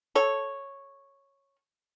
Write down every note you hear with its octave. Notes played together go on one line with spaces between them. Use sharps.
A4 C#5